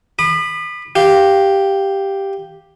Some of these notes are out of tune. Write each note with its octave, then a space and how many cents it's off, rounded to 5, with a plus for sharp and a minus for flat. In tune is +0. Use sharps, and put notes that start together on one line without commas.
B5 +0 D#6 -40
G4 +0 F5 -10